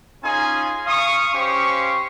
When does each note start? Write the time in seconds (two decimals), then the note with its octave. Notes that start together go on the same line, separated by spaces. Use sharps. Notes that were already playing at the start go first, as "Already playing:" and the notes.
0.23 C#4 D#4 F4 G#4 G#5 C6
0.86 F5 C#6 D#6
1.33 C#4 G4 C5 F5 C#6